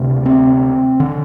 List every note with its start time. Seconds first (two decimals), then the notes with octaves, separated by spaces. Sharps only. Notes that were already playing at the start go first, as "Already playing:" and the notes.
Already playing: D2 C3
0.26 C4
1.00 D3